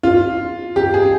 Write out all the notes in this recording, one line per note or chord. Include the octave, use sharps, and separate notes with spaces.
F4
G4
G#4